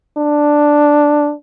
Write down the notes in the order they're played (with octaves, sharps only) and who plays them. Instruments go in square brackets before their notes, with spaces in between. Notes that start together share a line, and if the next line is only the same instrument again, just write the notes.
[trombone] D4